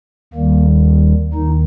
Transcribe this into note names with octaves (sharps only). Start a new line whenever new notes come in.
D#2 D#3 G3 A#3
D#2 D#3 D#4